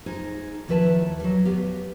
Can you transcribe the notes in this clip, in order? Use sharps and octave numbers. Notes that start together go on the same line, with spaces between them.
D#4 F4 G#4 C5
D#2 F3 E4 B4 A5
F#3 G3
B3 G4 F5